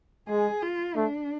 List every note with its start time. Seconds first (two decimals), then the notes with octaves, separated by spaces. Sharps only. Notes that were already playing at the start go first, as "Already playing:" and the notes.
0.29 G#3 G#4
0.62 F4
0.96 A3 D4